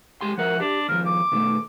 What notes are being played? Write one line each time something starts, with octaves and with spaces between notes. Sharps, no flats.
G#3 G4 C6
F3 A#4 E5 F#5
D4 G4
D#2 F3 A#4
D6
B2 D#3 A3